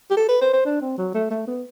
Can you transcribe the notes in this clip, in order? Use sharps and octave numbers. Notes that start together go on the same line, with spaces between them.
G4
A4
B4
C5
C5
D4
C4
F#3
A3
A3
B3